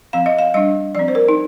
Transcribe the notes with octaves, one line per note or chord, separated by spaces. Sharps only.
F3 C4 F5
D#5
F5
G3 D4 D#5
F3 C4 D5
C5
A#4
D#4